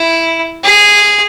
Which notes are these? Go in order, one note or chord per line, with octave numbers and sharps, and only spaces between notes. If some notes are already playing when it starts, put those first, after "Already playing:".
Already playing: E4
G#4